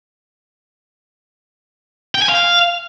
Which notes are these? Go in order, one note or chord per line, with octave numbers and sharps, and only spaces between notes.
G5
G#5
F5